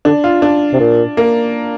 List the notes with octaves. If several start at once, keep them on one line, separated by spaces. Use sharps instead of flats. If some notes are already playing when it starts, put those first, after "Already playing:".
D3 D4
F4
D4
C3
A#2
A#3